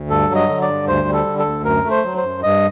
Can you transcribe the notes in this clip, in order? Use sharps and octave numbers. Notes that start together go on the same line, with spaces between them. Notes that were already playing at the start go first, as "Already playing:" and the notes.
Already playing: D2
G2 A4
F#3
D#5
D3
D5
G2
D2 C5
G3
A4
D3
A4
D2
F#2 A#4
A3
C5
F#3
C5
F#2
G2 D#5